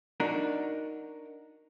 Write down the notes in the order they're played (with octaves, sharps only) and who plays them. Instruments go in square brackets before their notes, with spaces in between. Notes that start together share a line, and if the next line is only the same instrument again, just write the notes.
[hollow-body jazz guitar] D4 D#4 F#4 A#4